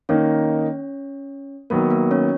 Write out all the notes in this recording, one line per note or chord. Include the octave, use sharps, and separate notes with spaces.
D#3 A#3 C#4 D#4 C#5
D#3 F#3 A#3 B3 A#4
A#3 A#4
C#4 C#5